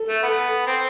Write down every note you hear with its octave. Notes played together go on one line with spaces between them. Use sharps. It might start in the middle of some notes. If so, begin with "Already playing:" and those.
Already playing: A4
A3
B3
C4